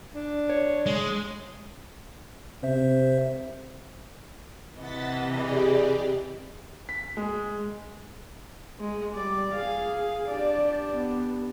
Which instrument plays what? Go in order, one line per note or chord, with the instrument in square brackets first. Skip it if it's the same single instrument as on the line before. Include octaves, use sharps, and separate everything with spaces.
[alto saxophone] D4
[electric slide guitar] C#5
[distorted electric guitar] G#3
[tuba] C3 [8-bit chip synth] C5 E5
[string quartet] C3 E3 D#5 [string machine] F#5 A6 B6
[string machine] G4 G#4 D5
[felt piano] B6
G#3
[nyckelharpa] G#3
[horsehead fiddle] G3 [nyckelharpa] D5
[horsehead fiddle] G#4 [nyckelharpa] F5
[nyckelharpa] D4 G4 [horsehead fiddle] D5
[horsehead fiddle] B3